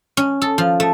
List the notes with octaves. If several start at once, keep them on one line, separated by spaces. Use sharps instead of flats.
C#4
A4
F3
A3